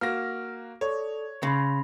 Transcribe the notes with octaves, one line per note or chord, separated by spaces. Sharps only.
A#3 F#4 F6 A#6
A4 C#5 D5
C#3 B5 C6 A#6